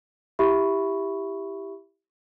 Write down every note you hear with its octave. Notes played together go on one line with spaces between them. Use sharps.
E4 G4 E5 B5 C#6